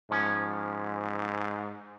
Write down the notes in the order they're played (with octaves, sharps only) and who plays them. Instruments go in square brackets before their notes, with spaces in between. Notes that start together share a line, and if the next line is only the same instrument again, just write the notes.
[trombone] G#2 [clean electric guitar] F3 C#4